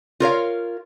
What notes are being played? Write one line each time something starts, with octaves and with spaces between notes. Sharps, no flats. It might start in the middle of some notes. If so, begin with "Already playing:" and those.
F4 A#4 C#5 F5